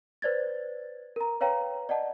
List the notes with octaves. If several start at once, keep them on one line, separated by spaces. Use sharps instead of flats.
B4 C5 D5 G#6 A6
A#4 A#5
B4 C#5 F5 G5 A#5
D5 D#5 F#5 A5